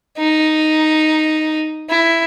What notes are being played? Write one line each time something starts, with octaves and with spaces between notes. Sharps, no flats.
D#4
E4